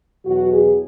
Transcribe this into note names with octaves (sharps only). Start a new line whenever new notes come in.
E2 B2 F#3 F#4
G#4